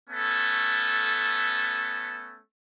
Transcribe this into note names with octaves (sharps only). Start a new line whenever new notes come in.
A3 B3 C#4 A4